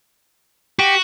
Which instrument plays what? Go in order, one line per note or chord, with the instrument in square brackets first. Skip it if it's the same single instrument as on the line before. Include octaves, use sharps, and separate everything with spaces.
[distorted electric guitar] F#4 [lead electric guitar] G4